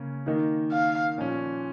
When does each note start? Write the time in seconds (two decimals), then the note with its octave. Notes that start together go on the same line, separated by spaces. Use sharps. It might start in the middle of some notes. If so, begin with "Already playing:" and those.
Already playing: C#3 A#3 C#4
0.26 D#3 A#3 D#4
0.72 F5
1.18 A#2 F3 C#4